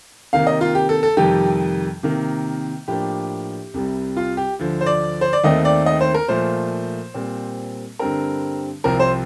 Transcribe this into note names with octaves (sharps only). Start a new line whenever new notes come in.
C3 D#3 A#3 F5
D#5
F4
G4
A4
A4
F2 C3 D#3 G3 G4
C3 D#3 A#3
A2 F3 A#3 D4 G4
C2 C3 G3
F4
G4
D2 D3 F3
C5
D5
C5
D5
D#2 D#3 A3 C4 D#5
D5
D#5
C5
A#4
A#2 F3 A3 C5
A#2 G3 C4
G2 D3 G3 C4 A#4
C2 C3 F3 C4 A#4
C5